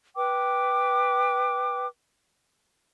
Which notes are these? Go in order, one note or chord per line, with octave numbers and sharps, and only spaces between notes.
B4 G5 D6